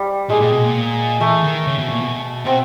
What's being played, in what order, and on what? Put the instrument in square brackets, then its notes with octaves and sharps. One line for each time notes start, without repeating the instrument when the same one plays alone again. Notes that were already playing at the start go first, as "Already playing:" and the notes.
Already playing: [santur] G3
[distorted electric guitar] A#2 [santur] G#3
[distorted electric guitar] A#2
B2
A#2
[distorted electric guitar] E3 [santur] A3
[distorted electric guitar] D#3
C#3
B2
A#2
B2
[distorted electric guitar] B2 [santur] C4